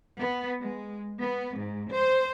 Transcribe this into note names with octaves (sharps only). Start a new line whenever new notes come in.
B3
G#3
B3
G#2
C5